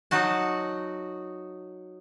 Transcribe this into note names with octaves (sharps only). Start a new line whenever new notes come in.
F#3 D#4 F#4 A5